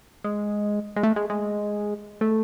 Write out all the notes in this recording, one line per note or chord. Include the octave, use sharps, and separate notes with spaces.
G#3
G#3
A3
G#3
G#3
A3